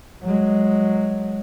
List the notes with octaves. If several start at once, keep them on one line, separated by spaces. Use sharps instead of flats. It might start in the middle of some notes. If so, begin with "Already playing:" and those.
F#3 G#3